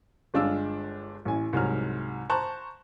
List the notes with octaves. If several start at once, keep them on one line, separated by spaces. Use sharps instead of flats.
G1 G#3 D4 F4 D6 E6
A1 A2 G#5
C2 G#2 F#3 F6
C5 A5 A#5 C#6 F#6